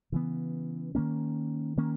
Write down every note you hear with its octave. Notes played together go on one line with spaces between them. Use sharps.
C#3 E3 B3
D#3 A#3 C#4
D#3 A#3 C#4